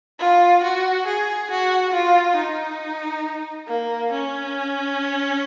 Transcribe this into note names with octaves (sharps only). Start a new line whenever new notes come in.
F4
F#4
G#4
F#4
F4
D#4
A#3
C#4